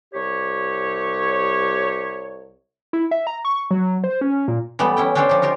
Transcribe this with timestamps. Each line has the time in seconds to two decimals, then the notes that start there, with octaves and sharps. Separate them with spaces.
0.14 C2 G4 C#5
2.93 E4
3.11 E5
3.27 A#5
3.45 C#6
3.71 F#3
4.04 C5
4.21 C#4
4.48 A#2
4.79 E3 G3 A3 B3
4.97 C#4 E4 G5
5.15 C#4 D4 G4 A4 C5 D5
5.29 F3 G4
5.42 D#4 F4 G4 A#4